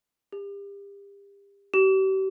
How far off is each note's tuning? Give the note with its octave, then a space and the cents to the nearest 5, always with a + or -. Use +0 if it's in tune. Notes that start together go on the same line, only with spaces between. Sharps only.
G4 +35
G4 -40